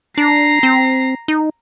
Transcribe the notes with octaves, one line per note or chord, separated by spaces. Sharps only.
D4 A#5 C7
C4
D#4